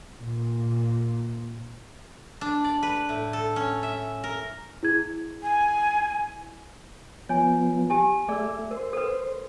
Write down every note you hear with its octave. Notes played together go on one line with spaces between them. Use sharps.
A#2
D4
D5
B4
A2
A4
C#4
E5
A#4
E4 G#4 G#6
G#5
F3 B3 C#5 G#5
G4 G#5 A5
A3 G#4 D5 E5
A#4 C5
A4 B4